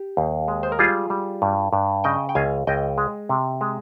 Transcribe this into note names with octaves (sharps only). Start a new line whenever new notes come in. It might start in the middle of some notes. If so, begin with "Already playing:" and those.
Already playing: G4
D#2
G#3
C5
A#4
G3 F4 G#4
G3
G2
G2
C#3 D#5 G5
G5
C#2 F5 G#5
C#2 D#5 G5
G#3
C3
G#3